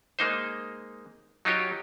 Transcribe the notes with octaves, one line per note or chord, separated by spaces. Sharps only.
G#3 A#3 D#4 C5
F#3 D#4 F4 G4 C#5